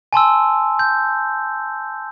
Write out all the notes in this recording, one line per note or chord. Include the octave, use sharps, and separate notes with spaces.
G#5 A5 C6 E6
G6